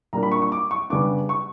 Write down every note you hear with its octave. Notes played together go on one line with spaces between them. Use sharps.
A#2 G3 A#3 D4 A#5
B5
C#6
C#6
D6
C#6
C#3 G3 B3 D4 D6
C#6